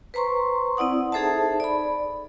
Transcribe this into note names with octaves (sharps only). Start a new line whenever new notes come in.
B4 C5 A#5 C6 C#6
C4 E4 D5 F#5 D#6
D#4 G#4 A4 C5 E5 A5
D5 B5